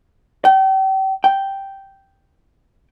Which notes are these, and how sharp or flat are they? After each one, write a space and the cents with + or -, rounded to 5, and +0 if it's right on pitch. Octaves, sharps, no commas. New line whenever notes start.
G5 -35
G5 -5